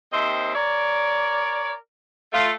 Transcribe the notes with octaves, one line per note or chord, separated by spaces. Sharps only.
D#2 C4 C5 D#5 E5
A#4 C#5 D5
A3 F4